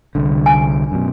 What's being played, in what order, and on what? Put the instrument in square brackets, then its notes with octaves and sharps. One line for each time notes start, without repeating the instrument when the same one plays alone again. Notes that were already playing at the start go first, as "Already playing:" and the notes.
[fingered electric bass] C2 D3
[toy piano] G#5
[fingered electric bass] F#2 B2